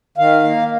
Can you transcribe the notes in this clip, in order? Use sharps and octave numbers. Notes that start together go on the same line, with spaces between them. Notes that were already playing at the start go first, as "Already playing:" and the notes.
D#3 F5
A#3